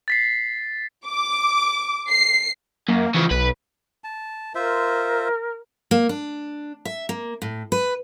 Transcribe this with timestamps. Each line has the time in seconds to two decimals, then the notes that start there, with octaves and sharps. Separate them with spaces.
0.08 A6 B6 C7
1.06 D6
2.10 C7
2.88 F#2 A#3
3.14 C#3 E3 F3
3.31 B1 B4
4.04 A5
4.55 F4 A#4 C5 E5
5.91 A#3
6.09 D4
6.85 E5
7.09 A#3
7.42 A2
7.72 B4